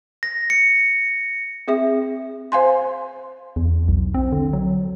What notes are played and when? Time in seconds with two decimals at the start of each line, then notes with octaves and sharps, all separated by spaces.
0.23 A#6
0.50 C#7
1.68 C4 G#4 E5
2.52 C5 F5 G#5 C6
3.56 E2
3.88 B1
4.14 C4
4.32 D3
4.53 F#3